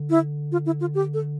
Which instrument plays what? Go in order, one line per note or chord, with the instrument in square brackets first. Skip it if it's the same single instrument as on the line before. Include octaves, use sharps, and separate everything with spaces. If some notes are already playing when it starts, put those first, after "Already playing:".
Already playing: [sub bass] D3
[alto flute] E4
F4
E4
F4
G4
A4